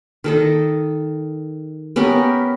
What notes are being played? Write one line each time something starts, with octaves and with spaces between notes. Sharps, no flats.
D#3 A4 D#5
B3 C#4 G4 A#4